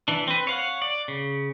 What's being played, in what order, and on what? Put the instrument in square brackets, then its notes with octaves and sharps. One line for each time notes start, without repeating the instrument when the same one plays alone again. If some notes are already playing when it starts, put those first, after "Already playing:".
[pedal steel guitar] E3 D4
C4 B4
C#5 F5 F#5
D5
C#3